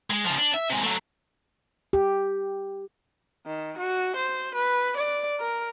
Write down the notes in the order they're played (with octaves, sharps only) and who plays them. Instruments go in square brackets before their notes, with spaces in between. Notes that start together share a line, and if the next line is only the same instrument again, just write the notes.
[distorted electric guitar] G#3
C#3 F3
D4
E5
C3 G#3
F#3 A3
[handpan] G4
[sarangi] D#3
F#4
C5
B4
D5
A#4